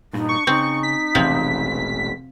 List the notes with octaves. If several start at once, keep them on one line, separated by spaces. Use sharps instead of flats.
G2 A#2 D#4
C#6
C#3 C4 D#4
B6
E1 A1 C3 E3 F3 C4